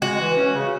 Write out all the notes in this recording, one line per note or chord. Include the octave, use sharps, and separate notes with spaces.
G#3 F#4
E3
C#4
C#3